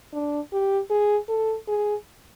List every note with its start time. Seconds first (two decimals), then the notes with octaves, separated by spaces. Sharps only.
0.13 D4
0.52 G4
0.90 G#4
1.29 A4
1.68 G#4